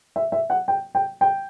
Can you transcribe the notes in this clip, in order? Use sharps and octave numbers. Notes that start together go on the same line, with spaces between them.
E5
E5
F#5
G5
G5
G5